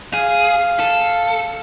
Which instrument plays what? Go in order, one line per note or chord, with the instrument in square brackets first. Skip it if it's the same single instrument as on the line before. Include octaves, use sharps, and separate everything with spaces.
[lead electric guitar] G#4 [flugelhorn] F5
[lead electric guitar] A4